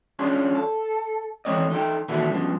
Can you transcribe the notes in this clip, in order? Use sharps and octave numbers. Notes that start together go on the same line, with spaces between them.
C#4 D4 F4 G#4
A4
E3 A3 C4 C#5 D#5
D#4 A4 F#5 G5
A#2 D#3 E3 E4 F#4 A4
G2 C#3 F3 B3